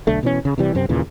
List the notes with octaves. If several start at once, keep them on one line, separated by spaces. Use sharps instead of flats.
B1 D3 A3
B2 E3 C#4
C#3
C3 E3 G3
F#2 C3 C4
D#2 A#2 C#3 E3